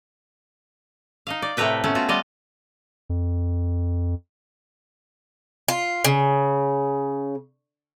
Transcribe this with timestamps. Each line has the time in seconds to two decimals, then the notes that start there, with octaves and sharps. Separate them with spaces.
1.27 D#4 D#5 F5
1.42 D5
1.57 A2 C3 A3 A#4 B4 G5
1.84 A3 B3 C#4
1.95 B3 F4 F#4
2.09 G3 F4 D5 D#5
3.10 F2
5.68 F4
6.04 C#3